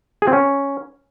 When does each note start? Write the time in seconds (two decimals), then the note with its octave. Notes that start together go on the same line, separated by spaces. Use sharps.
0.22 G#4
0.27 C4
0.33 C#4